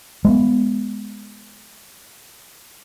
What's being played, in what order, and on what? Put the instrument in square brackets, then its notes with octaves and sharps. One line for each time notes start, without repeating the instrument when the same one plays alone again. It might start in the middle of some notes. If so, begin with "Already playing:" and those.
[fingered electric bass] G#3 A3 B3